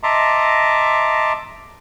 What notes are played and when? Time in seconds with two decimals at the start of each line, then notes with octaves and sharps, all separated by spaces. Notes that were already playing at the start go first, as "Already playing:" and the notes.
0.03 D#5 E5 A5 A#5 C6 D6